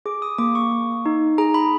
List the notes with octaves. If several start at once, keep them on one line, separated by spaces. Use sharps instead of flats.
G#4 D6
D#6
A#3 D6
C#6
A#3
D#4
G#4 A#5
B5